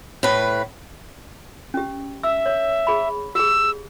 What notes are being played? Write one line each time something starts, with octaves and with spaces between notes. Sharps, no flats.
A2 B4
C#4 G4
E5 E6
C#5
G#4 B5
G4 G#4 E6